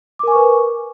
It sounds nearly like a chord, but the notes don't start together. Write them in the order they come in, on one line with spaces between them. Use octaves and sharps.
D6 A#4 G#5 C#6 B4